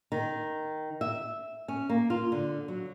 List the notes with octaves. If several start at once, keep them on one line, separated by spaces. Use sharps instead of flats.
D#3
E5
C#4
A#3
F4
D3
F#3